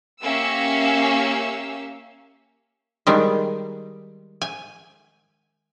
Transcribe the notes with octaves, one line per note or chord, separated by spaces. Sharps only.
A#3 C#4 G4 E5 F5 E6
D#3 G3 G#3
G#5